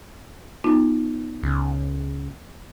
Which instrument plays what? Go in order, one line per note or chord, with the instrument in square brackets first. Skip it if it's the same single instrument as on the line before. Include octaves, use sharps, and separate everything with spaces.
[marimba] B3 D#4 F4
[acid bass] C#2